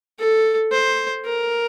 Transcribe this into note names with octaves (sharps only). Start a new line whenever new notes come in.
A4
C5
A#4